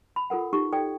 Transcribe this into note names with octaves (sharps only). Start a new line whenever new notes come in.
B5
F4 A4 A#4 F#5
D#4 G4 C#6
A4 D5 G5